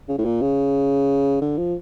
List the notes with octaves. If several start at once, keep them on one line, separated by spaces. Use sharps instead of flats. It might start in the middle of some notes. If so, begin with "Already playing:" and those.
C#3
A2
A#2
C#3
D3
F3